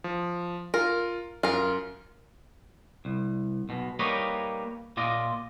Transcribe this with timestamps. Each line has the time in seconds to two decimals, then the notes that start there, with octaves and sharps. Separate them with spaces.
0.04 F3
0.74 F4 A#4
1.43 F#2 F4 A#4
3.05 C2
3.69 B1 B2
3.99 G3 A#3 D#4 B4 C#5 D#5
4.97 A#2 F4 D5 D#5